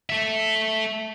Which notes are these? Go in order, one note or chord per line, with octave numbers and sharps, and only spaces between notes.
A4 E5